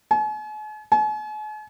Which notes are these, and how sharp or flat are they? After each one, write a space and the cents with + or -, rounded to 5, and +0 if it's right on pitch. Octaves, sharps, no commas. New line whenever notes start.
G#5 +45
G#5 +45